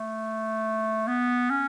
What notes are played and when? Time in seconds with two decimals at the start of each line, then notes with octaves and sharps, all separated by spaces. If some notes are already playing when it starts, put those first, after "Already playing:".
Already playing: A3
1.08 B3
1.50 C#4